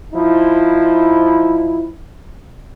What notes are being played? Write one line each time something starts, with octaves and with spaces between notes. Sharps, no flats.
F3 D#4 E4